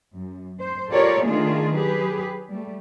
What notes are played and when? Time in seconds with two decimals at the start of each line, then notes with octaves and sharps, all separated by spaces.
0.15 F#2
0.60 C5
0.91 F4 G4 A4 A#4 C#5 D5
1.26 D#3 A3 D4 D#4 F4 G#4
1.76 F#3 G4 G#4 B4
2.50 G3 A3